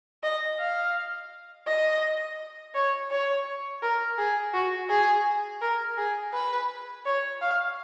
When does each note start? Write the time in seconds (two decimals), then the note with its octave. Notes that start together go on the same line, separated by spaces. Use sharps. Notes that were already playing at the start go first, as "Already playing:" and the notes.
0.23 D#5
0.59 F5
1.67 D#5
2.74 C#5
3.11 C#5
3.82 A#4
4.18 G#4
4.54 F#4
4.89 G#4
5.61 A#4
5.98 G#4
6.33 B4
7.05 C#5
7.42 F5